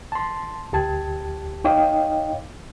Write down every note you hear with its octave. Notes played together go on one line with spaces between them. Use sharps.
A5 C6
D2 G4 A5 G#6
D#4 C#5 D#5 F5 G5 D6